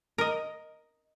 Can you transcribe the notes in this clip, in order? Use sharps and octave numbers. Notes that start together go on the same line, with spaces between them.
A#4 D#5